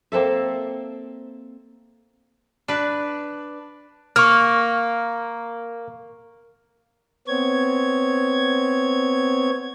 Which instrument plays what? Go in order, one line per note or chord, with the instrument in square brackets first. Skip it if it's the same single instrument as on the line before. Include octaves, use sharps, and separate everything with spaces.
[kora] A#3 C4 A4 E5
[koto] D4 B4
[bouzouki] A#3 [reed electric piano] C#6 F6
[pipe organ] B3 C4 C#5 G#6